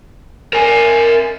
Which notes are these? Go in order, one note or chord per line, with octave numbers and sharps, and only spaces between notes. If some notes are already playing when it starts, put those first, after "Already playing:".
A#4 G#5